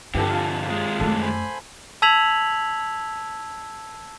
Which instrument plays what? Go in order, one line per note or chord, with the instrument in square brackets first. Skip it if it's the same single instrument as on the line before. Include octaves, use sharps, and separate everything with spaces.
[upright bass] G2 [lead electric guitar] D3 F3 [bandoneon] E3 C4 [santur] G4 A4
[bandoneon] C3 F4 [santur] F5 G#5
[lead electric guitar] D#2 G#3 [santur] D#6
[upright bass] F#2 A3 [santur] A4 D5
[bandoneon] C5 G#5 B5
[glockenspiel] A5 E6 G#6 B6 F7 F#7